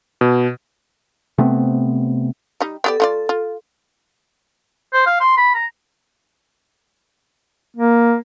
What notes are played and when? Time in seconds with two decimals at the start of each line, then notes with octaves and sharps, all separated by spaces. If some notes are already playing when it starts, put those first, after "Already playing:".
0.21 B2
1.38 C3 A3 B3 C4
2.61 G3 D#4
2.84 B3 G4 A4 D5
3.00 A3 F4 D5
3.29 F4
4.93 C5
5.06 F5
5.20 C6
5.37 B5
5.54 A#5
7.77 A#3